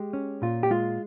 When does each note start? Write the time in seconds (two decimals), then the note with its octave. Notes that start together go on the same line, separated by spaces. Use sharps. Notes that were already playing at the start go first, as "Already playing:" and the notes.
Already playing: G#3 G4
0.13 C#4
0.42 A#2 F4
0.63 G4
0.70 G#3 F4